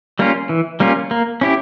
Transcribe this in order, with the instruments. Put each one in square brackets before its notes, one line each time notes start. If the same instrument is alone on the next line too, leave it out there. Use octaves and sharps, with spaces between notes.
[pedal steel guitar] G3 A#3 C#4 F4
E3
G3 A#3 C#4 F4
A#3
C#4 E4 G4